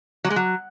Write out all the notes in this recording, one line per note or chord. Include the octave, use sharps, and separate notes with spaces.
F#3
G#3
F#3